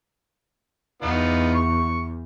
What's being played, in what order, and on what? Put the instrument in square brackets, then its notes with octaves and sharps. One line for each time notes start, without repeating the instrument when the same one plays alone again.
[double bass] E2 [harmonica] B3 D#4 F4
[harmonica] C#6